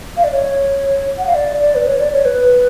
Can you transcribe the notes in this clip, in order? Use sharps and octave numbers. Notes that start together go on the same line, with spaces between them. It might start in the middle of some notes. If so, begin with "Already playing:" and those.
F5
D5
C#5
F#5
F5
D5
D5
B4
C#5
D5
C#5
B4